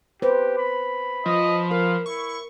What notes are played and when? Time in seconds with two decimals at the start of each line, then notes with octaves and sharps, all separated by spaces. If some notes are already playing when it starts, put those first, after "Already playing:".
0.22 G4 B4 C5
0.58 B5
1.26 F3 D#5
1.71 A#4 F5
2.06 E4 C#6